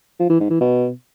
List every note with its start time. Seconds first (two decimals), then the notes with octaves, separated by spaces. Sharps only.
0.19 F3
0.30 E3
0.40 G#2
0.50 E3
0.61 B2